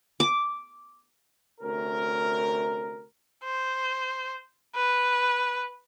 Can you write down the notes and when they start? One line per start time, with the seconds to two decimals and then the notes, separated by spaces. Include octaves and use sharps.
0.20 D6
1.60 D2 C3 C#4 A#4
3.44 C5
4.75 B4